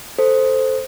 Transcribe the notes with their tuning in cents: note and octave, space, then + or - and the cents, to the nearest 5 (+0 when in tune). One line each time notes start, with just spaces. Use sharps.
A4 +0 C5 +0